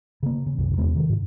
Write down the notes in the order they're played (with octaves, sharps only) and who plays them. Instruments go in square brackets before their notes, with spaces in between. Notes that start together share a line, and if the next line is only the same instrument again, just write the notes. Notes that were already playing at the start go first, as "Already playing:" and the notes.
[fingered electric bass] C#3 A#3
C#3
C2 F#2 C3
E2 G#3 B3 C#4
C3 D#3
G#2